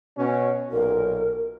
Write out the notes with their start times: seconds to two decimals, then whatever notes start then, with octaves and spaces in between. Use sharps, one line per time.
0.17 B2 C#4
0.71 B1 A#2 A#4